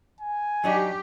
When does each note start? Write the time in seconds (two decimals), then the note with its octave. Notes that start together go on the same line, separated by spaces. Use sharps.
0.21 G#5
0.64 F#3 D4 D#4 G4